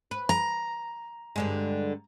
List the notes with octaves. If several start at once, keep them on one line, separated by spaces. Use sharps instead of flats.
B4
A#5
G2 D3 G#3